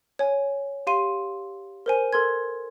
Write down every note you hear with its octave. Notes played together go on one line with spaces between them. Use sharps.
C#5 G#5
G4 F5 C6 D#7
A#4 C5 G#5
A4 A#4 C6 G#6